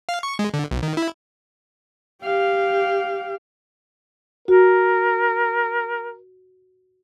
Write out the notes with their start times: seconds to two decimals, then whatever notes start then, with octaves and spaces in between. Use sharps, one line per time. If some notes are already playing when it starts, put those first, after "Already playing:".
0.09 F5
0.23 C#6
0.39 G#3
0.54 D3
0.71 B1
0.83 D#3
0.97 E4
2.22 G4 F5
4.48 F#4 A#4